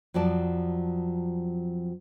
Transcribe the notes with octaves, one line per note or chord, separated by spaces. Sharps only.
F2 F3 F#3 D5 A5